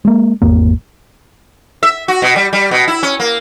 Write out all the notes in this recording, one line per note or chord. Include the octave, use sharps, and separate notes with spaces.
G#3 A#3
G#1 E2 A#3
E5
F#4
B2
G3
G3
B2
E4
C#4
A#3